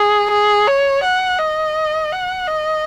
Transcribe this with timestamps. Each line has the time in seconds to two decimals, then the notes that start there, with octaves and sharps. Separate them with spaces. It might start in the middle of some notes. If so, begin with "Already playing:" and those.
Already playing: G#4
0.31 G#4
0.68 C#5
1.04 F#5
1.39 D#5
2.12 F#5
2.47 D#5